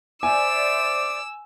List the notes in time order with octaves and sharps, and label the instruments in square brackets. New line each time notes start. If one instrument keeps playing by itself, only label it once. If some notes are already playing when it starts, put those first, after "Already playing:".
[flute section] C5 D5 E5 [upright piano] G#5 [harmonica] D6 [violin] E6